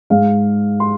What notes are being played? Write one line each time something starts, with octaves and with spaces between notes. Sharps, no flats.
G#2 G#3 F5
C6